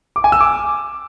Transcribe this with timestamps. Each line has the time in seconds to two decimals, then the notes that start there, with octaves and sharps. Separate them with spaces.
0.16 D6
0.24 G#5
0.32 E6
0.40 D6